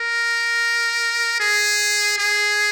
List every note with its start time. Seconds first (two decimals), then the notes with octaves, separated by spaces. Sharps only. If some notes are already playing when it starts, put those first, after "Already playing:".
Already playing: A#4
1.40 G#4
2.18 G#4